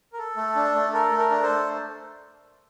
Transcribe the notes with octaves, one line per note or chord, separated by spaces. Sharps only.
A#4
A4
A3
D4
A3
A4 A#4
A3
A#4
D4
A4 C5
A3